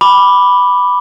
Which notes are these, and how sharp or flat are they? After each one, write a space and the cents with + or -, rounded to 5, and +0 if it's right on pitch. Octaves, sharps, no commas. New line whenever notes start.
B5 +0 D6 +0